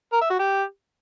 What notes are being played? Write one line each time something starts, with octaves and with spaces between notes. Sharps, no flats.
A#4
E5
F#4
G4